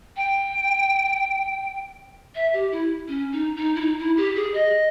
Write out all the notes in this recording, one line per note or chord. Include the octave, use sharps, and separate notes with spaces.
G5
E5
G4
E4
C#4
D#4
D#4
E4
D#4
E4
G4
G#4
D#5